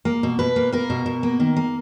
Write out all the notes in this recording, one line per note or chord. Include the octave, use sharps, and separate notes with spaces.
A#3
B2
B2 B4
A#3
A#3 A#4
B2
B2
A#3
D#3
A#3